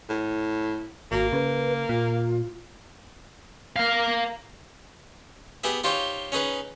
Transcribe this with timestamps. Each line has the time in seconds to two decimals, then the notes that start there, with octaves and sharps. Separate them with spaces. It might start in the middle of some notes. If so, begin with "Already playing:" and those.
0.09 A2
1.12 G#1 A#3 F#4
1.33 C#3 B4
1.89 A#2 F4
3.76 A#4 F5
5.64 B3 G4 G#4 E5
5.84 D#4 F4 G4 C5 C#5
6.32 C#4 D#4 G#4 B4